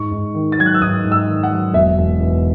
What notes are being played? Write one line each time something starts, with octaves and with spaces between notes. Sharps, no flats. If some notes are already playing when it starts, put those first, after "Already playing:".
Already playing: G#2 C#6
G#2
D#3
A6
F#3 G#6
F#6
E6
G#2 D#6
G#2
E6
D#3
F#5
F#3
E1 E5
E1
E2